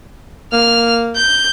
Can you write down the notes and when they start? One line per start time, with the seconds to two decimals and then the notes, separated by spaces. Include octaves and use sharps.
0.53 A#3 F6
1.16 G6